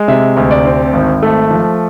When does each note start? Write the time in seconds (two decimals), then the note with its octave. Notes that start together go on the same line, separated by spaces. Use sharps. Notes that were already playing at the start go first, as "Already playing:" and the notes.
Already playing: G#3
0.08 C3 E5
0.36 D2
0.51 D5
0.65 C4
0.93 G#1
1.23 A3
1.50 F3